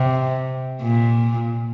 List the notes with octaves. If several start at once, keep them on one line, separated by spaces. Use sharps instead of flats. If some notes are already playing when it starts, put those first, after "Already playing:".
Already playing: C3
A#2